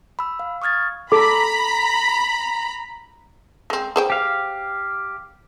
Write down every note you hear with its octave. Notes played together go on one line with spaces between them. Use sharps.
B5 E6
F5
C#6 D#6 F6 G#6 A6
A4 A#5 B5 D6
G#3 C4
G#4 C5 G5
G4 F5